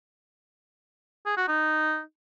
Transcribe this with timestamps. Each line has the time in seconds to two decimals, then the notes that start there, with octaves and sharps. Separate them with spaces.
1.26 G#4
1.37 F#4
1.48 D#4